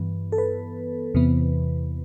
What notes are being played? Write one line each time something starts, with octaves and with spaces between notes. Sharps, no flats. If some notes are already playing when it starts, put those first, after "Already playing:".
Already playing: G2 E3 B3
A4
B4
E2 C3 E3 B3